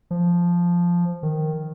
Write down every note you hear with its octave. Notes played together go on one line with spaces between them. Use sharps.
F3
D#3